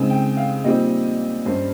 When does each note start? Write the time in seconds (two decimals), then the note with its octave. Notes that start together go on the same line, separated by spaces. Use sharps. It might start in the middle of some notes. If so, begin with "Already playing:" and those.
Already playing: C#3 G#3 C4 D#4 G#5
0.10 G5
0.37 F5
0.64 A#2 G3 C4 D#4 D#5
1.46 G2 G3 C#4 C5